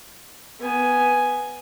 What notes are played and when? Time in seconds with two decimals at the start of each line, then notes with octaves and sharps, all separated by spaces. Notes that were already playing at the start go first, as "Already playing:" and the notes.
0.60 B3 G#5